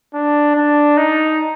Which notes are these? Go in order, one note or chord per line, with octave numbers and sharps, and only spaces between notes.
D4
D4
D#4